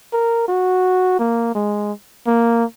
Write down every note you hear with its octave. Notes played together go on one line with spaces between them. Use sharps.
A#4
F#4
A#3
G#3
A#3